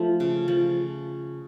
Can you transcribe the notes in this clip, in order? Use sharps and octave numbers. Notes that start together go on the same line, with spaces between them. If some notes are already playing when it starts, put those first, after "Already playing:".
Already playing: F3 A3
C#3
F3